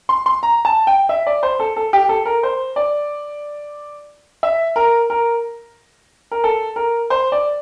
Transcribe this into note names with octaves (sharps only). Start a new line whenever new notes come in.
C6
C6
A#5
A5
G5
E5
D5
C5
A4
A4
G4
A4
A#4
C5
D5
E5
A#4
A#4
A#4
A4
A#4
C5
D5